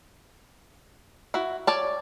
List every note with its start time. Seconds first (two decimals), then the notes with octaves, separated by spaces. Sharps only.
1.34 E4 F#4
1.67 C#5 D5 A5